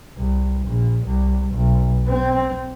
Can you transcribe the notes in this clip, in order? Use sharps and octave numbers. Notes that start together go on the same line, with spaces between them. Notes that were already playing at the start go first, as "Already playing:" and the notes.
C2
A#1
C2
B1
C4